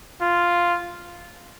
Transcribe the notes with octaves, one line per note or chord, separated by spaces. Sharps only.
F4